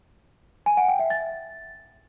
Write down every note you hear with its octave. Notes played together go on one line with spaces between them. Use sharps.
G#5
F#5
G5
E5
A6